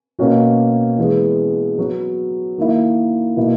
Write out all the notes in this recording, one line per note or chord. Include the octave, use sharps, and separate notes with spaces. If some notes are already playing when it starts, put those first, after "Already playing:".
B2 A#3 C#4 F#4
E3 G#3 B3
F#3 B3 F#4
D#3 A#3 E4
B2 A#3 E4